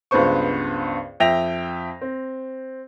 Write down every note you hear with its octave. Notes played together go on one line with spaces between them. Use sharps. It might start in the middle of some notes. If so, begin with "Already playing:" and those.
C#2 G2 B3 B4 C5 C#6
F2 E5 G5 A#6 F7
C4